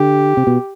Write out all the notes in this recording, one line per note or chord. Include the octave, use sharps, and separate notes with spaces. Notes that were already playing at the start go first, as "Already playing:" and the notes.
Already playing: D3 G4
C3
B2